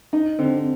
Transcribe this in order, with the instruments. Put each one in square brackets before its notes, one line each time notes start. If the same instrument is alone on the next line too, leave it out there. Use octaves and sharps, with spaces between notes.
[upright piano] D#4
[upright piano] D3 [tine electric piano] C4